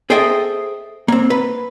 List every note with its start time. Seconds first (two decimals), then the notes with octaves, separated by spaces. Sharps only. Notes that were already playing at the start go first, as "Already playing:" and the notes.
0.10 G#4 A4 C5 D#5 E5 G5
1.08 A#3 C4
1.30 B4